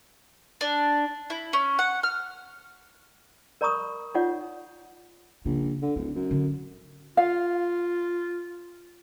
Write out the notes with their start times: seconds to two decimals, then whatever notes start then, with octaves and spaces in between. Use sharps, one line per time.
0.61 D4
1.30 E4
1.53 C#4
1.79 F#5
2.03 F6
3.61 A#4 D5 A#5 B5 C#6 D#6
4.15 D#4 F4 C#5 D5 F#5
5.45 A#1 C#3
5.82 D3
5.96 D1 D#4
6.15 F#2
6.31 D3
7.17 F4 F5